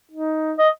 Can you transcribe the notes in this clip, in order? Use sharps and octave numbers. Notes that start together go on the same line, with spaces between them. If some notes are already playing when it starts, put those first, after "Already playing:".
D#4
D#5